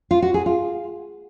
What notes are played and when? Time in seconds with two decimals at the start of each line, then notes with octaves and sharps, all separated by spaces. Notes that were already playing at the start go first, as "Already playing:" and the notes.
0.11 F4
0.22 F#4
0.34 G#4
0.46 F4